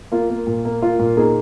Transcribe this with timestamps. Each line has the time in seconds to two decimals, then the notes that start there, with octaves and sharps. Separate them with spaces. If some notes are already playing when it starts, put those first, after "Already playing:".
0.12 A#3 F4
0.30 A#3
0.47 A#2
0.65 A#3
0.82 A#3 F4
0.99 A#2
1.17 A#3 D#4 G#4